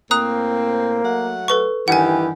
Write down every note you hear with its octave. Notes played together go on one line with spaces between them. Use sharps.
A2 A#3 C4 A#5 D#6 F#6
F#3 A3 F#5
A4 B4 C#6
G2 D#3 E3 G4 F#5 G#5